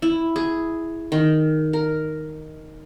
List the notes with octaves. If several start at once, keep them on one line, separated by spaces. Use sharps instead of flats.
E4
G#4
D#3
A#4